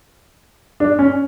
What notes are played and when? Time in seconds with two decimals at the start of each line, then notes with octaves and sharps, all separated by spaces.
0.80 D4
0.99 C#4